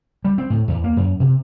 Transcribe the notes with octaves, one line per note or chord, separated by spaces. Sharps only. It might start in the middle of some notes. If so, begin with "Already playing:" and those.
G3
C4
A2
E2
A#3
F#2
C3